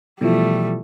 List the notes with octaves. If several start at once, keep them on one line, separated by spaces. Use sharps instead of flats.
B2 E3 F3 G3 A3